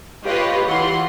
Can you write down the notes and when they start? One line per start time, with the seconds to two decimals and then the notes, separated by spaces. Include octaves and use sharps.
0.25 F4 G4 B4 C#5 D#5 F5
0.65 E3 F4 F#5 C6